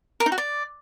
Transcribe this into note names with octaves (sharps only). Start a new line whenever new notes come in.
A#4
D#4
F#4
D5